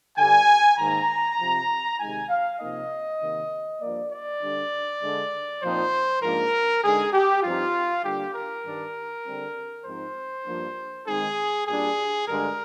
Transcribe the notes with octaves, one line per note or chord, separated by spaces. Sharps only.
G2 D3 G3 G#5
G#2 D#3 A#3 A#5
C3 F3 C4
C3 D#3 G#3 D#4 G#5
F5
C3 F3 A#3 D#4 D#5
C3 D#3 A#3
G2 F3 A#3 D5
D5
D3 G3 D4
D3 G#3 D4
A#2 F3 C4 D#4 C5
G#2 F3 A#3 D4 A#4
D3 G#3 D#4 G#4
G4
G2 F3 C4 D#4 F4
D3 G3 A#3 D4 G4
A#4
G2 D#3 G3 D4
D3 G3 C4
G#2 F3 C4 D#4 C5
G2 F3 A#3 D4
D#3 G#3 C4 D#4 G#4
A#2 G3 D4 G#4
G2 D3 G#3 A#4